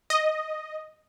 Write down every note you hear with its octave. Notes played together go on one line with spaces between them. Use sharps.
D#5